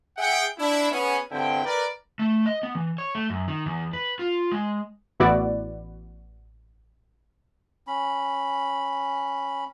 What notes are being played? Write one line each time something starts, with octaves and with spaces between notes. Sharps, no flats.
G#4 E5 F#5 G5
D4 E4
B3 C#4 G#4
E2 G2 D3 C4 E4 G5
A#4 B4 D5
A3
D#5
B3
E3
C#5
A3
F#2
D#3
E2
B4
F4
G#3
A1 B3 E4 F#4 D5
C#4 B5